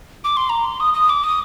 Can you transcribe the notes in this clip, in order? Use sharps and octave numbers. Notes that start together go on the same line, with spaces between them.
D6
C6
A#5
C6
D#6
D#6
D6
D#6